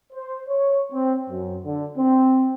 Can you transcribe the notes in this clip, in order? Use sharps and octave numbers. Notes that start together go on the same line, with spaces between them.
C5
C#5
C4
F#2
D3
C4